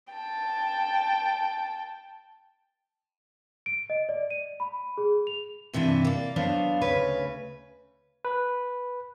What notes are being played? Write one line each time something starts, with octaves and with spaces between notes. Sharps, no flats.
G5 A5
D7
D#5
D5
D#7
B5
G#4
F7
G2 C3 E3 D4 E4
A#3 D5
F#3 B3 D4 C5 F5
D2 C#3 B4 C#5
B4